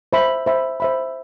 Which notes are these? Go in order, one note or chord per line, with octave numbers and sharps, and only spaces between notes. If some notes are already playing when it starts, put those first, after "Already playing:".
C5 E5 B5
C5 E5 B5
C5 E5 B5